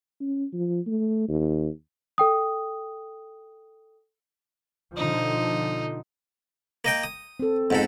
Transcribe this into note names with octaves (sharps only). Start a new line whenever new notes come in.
C#4
F3
A3
D#2
A4 G5 D#6
B2 D3 F3 D#4
A#3 D#5 G5
D#6
C4 A4
F2 G#2 B3 C4 A4 F#5